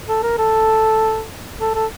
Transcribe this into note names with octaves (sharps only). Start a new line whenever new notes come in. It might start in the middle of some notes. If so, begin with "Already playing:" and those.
A4
A#4
A4
A4
A4